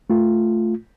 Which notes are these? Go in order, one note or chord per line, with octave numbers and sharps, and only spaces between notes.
A3 F4